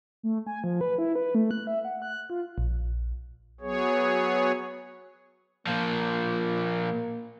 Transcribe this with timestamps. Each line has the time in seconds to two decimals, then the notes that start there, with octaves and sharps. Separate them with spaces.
0.23 A3
0.47 G#5
0.64 F3
0.81 B4
0.98 E4
1.15 B4
1.35 A3
1.51 F#6
1.67 E5
1.85 F#5
2.02 F#6
2.30 F4
2.58 A#1
3.61 F#3 B3 G#4 C#5
5.67 A#2 F3 A#3